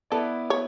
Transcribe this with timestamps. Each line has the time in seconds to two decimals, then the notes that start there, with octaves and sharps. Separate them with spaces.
0.11 B3 E4 A4 B4 D5
0.50 C#5